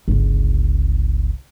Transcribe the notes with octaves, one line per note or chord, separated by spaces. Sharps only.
G1 C#2